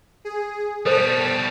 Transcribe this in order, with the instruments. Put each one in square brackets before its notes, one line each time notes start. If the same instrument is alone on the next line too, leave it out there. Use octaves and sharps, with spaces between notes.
[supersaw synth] G#4
[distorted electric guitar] B2 G3 [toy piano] A4 C5 [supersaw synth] A5 B6